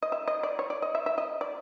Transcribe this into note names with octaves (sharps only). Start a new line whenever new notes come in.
D#5
E5
D#5
D5
C#5
D5
D#5
E5
E5
D#5
D5